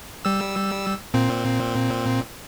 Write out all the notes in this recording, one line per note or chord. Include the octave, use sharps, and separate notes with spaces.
G3 E6
A#2 C4